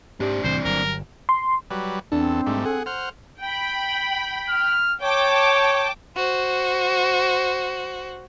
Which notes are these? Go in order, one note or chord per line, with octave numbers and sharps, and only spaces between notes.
G#2 C4 D4 G4
C2 A2 C3 E3 C5
G1 F#3 A#4
C6
F#3 G3 B4
E2 C4 D4 A4
G#2 G3 A3
G#4 A4 F#5
C5 F#5 F6
G5 B5
F6
C#5 G5 A5 D6
F#4 C5